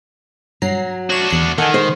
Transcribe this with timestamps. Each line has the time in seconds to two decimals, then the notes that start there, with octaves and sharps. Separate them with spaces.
0.62 G2 F#3 A#5 C7
1.10 D4 F#4 C#5 E7
1.31 E2 C7
1.58 D#3 A4 D#5 F#5 G#5
1.74 G#3 C5